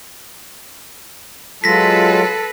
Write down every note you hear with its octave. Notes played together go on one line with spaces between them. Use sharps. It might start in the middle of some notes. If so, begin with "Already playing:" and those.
F#3 G#3 F4 A4 B4 A#6 B6